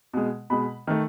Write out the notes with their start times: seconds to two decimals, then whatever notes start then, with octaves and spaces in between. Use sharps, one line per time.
0.14 B2 G#3
0.50 B2 G#3 B5
0.87 D#3 A3